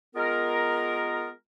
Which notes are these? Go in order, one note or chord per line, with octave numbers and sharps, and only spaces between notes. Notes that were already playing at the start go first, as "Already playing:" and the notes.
G#3 B3 F4 A#4